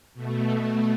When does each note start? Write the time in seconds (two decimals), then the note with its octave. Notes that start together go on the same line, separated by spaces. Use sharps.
0.14 B2 A3